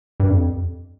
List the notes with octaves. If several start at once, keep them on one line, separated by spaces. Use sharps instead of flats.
G2
F2